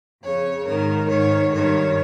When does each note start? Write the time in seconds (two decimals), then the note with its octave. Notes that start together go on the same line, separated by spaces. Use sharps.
0.21 F2 C#3 C#5
0.65 G#2 D#3 A#4
1.08 G#2 D#3 C#5
1.52 G2 D#3 C#5